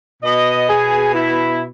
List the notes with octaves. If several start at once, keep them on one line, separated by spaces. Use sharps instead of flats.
B2 D#5
G#4
E4